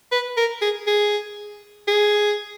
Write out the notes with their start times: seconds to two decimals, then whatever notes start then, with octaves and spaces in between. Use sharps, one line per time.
0.12 B4
0.37 A#4
0.62 G#4
0.87 G#4
1.87 G#4